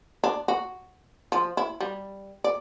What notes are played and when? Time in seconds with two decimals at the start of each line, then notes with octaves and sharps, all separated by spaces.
0.24 D4
0.48 F#4
1.32 F3
1.57 E4
1.81 G3
2.44 D5